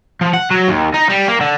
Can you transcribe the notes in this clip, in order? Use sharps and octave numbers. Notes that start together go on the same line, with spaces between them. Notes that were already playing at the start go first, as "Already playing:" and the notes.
F3
F#5
F#3
D#2
D#4
G3
A#3
D3